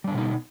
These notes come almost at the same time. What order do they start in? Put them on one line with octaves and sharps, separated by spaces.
G3 D4 D3 B2 D#4